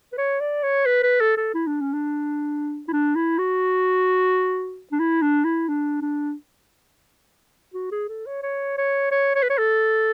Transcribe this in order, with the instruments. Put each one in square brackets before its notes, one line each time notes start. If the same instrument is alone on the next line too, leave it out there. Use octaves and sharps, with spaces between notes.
[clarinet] B4
C#5
D5
C#5
B4
B4
A4
A4
E4
D4
C#4
D4
E4
D4
E4
F#4
D4
E4
D4
E4
D4
D4
F#4
G#4
A4
C#5
C#5
C#5
C#5
C#5
B4
C#5
A4